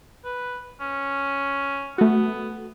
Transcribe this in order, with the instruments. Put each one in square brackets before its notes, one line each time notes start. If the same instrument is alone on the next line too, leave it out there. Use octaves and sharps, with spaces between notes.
[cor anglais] B4
C#4
[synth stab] A3 F#4 [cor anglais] B3